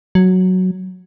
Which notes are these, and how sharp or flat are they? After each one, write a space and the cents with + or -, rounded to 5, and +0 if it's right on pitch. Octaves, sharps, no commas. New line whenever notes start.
F#3 +0